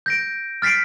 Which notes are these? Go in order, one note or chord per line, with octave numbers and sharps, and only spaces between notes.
G6 A#6 D7
F6 A6 B6 C7 D7